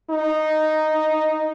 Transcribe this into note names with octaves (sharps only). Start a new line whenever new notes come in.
D#4